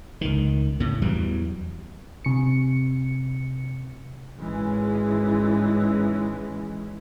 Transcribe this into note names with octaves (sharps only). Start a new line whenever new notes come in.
C#2 D#3
A2 C#3
E2 E3 F#3 G3
C3 C#7
G#1 G#2 E3 G#3 C#4